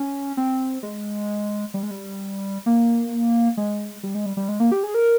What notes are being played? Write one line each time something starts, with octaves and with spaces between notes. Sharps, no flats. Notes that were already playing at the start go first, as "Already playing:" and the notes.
Already playing: C#4
C4
G#3
G3
G#3
G3
A#3
G#3
G3
G#3
G3
G3
G#3
A#3
G4
G#4
A#4